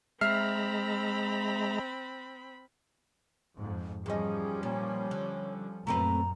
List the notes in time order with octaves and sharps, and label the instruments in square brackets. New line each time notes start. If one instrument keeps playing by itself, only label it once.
[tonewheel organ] G#3 A#5 [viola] C4 B5 [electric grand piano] E5 F6 C7
[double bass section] F2 G#2
[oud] E2 D#4 [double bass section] F3 G3 C#4 [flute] G#4
[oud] A#2 [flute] C#5
[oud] D3
[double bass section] F#2 A#2 [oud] A3 C4 B4 [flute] A#5